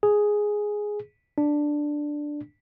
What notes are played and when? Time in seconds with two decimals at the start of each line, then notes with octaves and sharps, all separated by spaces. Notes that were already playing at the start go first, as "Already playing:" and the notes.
0.03 G#4
1.38 D4